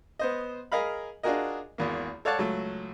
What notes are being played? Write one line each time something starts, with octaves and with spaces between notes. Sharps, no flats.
B3 C5 D#5
G#4 A#4 D#5 F5 B5
D4 F4 F#4 G#4 A#4 D#5
G#1 E2 A#3
A4 C#5 D5 F5 F#5 A5
C#2 F#3 A3